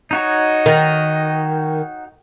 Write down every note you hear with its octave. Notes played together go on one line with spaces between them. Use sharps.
D#4 F#4 C#5 D#5
D#3